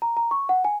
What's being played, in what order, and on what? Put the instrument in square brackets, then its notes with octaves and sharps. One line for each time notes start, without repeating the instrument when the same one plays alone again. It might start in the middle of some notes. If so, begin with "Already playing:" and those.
[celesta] A#5
A#5
C#6
F#5
G#5